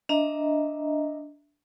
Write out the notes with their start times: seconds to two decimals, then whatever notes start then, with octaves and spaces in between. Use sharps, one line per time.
0.09 D4 D#5 E5 A#5